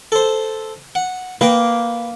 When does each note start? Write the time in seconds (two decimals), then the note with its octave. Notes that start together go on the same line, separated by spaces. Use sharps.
0.12 A4 C5
0.95 F#5
1.41 A#3 B4 D#5 G5